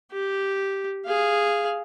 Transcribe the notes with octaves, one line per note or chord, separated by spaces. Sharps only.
G4
G#4 F5